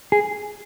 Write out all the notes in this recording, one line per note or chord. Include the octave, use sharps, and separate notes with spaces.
G#4